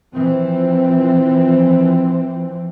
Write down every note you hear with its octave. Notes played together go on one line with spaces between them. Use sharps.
E3 F3 C4